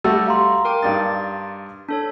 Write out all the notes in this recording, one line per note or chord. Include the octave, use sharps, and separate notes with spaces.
G3 A3 F#4 E6
F5 A#5 C6
A#4 G5 D6
G2 D4 D#4 A6
D4 A4 C#5